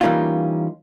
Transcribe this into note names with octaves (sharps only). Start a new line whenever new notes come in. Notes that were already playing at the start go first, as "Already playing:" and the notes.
E3 G3 A#3 C#4 D#4 F4